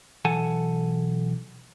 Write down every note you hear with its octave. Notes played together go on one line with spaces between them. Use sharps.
B1 E3 A4 F#5 G#5 A5